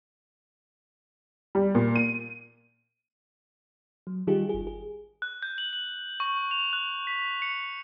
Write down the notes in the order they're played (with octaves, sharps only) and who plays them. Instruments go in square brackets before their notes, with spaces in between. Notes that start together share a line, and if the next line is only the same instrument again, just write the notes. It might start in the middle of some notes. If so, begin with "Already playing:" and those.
[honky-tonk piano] G3
A#2
D#7
[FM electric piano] F#3
D#3 G3 D#4 F4 G4 G#4
G1 G#4
G#4
[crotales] F#6
G6
F#7
F#7
C#6
F7
F#6
B6
C#7